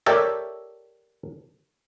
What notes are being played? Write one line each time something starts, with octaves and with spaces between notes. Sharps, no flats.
G4 A4 A#4 C#5 D5 E5